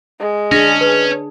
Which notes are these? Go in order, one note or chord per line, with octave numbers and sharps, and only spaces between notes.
G#3
C#4 D4 G#4 A#6
B4